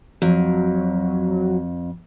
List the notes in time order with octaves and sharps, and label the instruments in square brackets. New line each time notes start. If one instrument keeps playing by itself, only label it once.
[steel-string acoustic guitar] F2 [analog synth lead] F#3